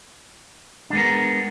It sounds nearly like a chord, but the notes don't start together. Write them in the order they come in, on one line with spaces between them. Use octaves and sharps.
D4 G#3 B3 A#4